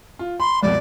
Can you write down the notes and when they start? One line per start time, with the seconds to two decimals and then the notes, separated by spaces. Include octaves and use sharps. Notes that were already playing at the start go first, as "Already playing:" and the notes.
0.19 F4
0.40 B5 C6
0.63 C2 F2 B2 D5